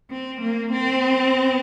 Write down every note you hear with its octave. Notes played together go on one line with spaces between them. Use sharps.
C4
A#3
C4